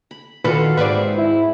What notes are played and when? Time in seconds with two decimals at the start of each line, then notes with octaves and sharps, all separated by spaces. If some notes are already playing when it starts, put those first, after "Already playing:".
0.11 B5
0.44 A#2 D3 D#3 F4 F#4 A4 B4
0.77 G#2 C4 G#4 B4 D5 E5
1.18 E4